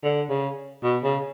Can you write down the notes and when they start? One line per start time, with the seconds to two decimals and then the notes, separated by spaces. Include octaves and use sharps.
0.03 D3
0.29 C#3
0.83 B2
1.03 C#3